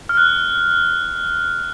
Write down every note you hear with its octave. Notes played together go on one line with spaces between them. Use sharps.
F6
F#6